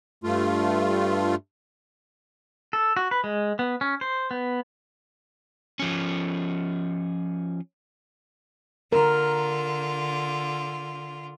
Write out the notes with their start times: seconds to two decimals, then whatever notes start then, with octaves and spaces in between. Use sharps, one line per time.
0.24 G2 A3 F4
2.73 A4
2.97 F#4
3.11 B4
3.24 G#3
3.59 B3
3.81 C#4
4.01 C5
4.31 B3
5.79 F3 C#4
8.93 D3 F4 A#4